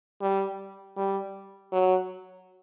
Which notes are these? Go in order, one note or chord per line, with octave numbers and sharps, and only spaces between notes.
G3
G3
F#3